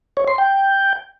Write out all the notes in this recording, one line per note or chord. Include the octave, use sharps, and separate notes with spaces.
C#5
C6
G5